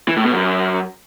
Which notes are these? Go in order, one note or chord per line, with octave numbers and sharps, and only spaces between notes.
E3
A2
B2
F#2